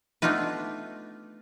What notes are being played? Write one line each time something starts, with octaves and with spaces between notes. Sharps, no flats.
A3 B3 D4 D#4 F4 B4